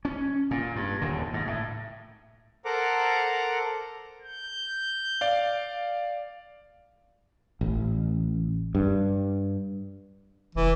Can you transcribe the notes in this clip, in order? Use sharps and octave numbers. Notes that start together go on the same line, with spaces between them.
C#4
A#2
G2
D#2 A#2 D3
G#2
A2
A4 A#4 C5 F#5 A#5 D6
G6
D5 F5
A1
G2
F1 E3